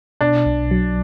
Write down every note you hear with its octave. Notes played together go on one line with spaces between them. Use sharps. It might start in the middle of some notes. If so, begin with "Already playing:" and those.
B2 D4
B1
F#3